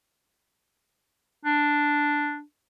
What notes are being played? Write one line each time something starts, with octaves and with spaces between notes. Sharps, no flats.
D4